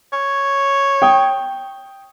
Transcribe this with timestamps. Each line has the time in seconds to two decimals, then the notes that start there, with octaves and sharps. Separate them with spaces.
0.13 C#5
1.02 G5 D#6